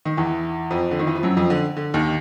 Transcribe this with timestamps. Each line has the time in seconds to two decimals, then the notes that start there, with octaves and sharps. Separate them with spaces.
0.05 D#3
0.17 E2 E3
0.71 F2 F3
0.91 D3
0.99 D#3
1.07 E3
1.15 F3
1.23 F#2 F#3
1.37 F2 F3
1.50 D3
1.77 D3
1.94 D#2 D#3